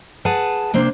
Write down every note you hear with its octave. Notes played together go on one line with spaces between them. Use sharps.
G#4 B4 F#5 A5
C3 A#3 D4 C5